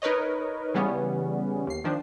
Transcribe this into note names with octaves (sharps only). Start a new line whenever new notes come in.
D#4 A#4 B4 C#5 D#5
C#3 E3 G3 B3 C#4
D#2 C7
D#3 F3 D4